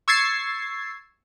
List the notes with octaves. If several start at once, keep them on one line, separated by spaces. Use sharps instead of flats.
C#6 E6 G#6 A6 C7